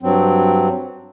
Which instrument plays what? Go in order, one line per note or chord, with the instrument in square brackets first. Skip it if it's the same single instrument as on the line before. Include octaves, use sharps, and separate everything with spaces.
[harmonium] G2 F#3 C4